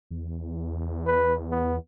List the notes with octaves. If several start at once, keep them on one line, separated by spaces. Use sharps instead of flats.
E2
B4
B3